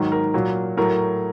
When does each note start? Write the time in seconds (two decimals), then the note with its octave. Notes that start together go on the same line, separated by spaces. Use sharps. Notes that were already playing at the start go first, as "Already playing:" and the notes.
Already playing: G#2 D#3 F#3
0.12 A#4
0.34 A#2 F#3
0.77 A2 F#3 A#4